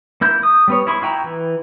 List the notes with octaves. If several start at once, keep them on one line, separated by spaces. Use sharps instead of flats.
A#3 E4 G6
D#6
G3 B3 C#5
E4 G#4 B5 C#6
E4 F#4 G5 A#5
E3